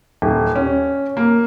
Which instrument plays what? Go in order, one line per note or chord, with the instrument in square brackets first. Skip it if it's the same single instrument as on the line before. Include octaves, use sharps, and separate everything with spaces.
[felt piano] D#1
C#4
A#3